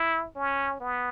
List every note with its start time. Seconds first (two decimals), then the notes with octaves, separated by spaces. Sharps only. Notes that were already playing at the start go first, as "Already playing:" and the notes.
Already playing: E4
0.36 C#4
0.80 B3